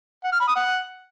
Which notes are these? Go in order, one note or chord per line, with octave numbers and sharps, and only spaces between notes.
F#5
F6
B5
D#6
F#5